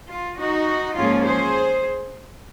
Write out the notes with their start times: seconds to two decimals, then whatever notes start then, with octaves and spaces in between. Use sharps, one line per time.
0.10 F4
0.38 D#4 F#4
0.96 G#2 F3 A#3 C#4 F4 G#4
1.24 G#4 C5